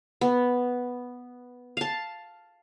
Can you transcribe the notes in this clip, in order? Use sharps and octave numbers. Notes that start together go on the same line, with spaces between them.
B3
F5 A5